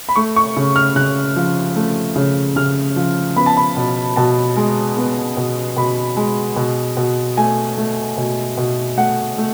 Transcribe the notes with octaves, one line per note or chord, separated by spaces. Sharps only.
B5
A3 C#6
C#6
C#3
F6
C#3 F#6
F3
A3
C#3
C#3 F6
F3
B3 B5
A5
B5
B2
B2 A5
G#3
B3
B2
B2 B5
G#3
B2
B2
A3 G#5
A3
B2
B2
A3 F#5
A3